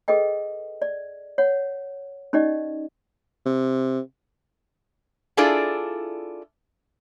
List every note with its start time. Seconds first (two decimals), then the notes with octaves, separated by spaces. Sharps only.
0.08 G#4 A4 B4 D#5 G5
0.82 D5
1.38 C#5 F#5
2.33 C#4 D#4 G4 D5 D#5
3.46 C3
5.37 D4 E4 F4 G#4 A4 D5